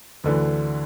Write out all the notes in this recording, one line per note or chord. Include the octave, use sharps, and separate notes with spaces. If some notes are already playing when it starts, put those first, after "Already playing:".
D2 D3 E3